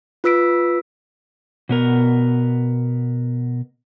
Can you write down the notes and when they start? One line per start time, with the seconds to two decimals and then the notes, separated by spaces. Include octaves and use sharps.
0.24 F4 B4 E6 B6 D7
1.69 B2 B3 A#4